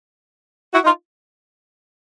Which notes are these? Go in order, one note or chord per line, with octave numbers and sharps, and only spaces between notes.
E4 F#4
D#4 F4